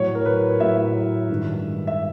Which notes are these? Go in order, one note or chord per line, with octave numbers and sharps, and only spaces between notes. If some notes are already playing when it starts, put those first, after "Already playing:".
Already playing: A2 F#3 C#5
A#4
B4
A2 F#3 E5
G2 D#3 G#3
E5